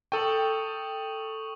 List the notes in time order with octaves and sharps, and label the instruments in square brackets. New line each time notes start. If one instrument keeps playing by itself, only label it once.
[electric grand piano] A4 G5 [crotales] C#6 D#6 F#7